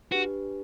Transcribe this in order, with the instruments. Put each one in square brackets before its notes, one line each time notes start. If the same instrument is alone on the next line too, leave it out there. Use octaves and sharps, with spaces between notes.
[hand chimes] D4 G4 B4 [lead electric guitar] F#4